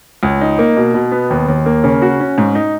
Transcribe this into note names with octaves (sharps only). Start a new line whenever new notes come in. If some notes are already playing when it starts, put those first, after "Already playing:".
C#2
D#4
A#3
B2
B2
B3
D#2
D#2
A#3
C#3
F#4
C#4
G#2
D#4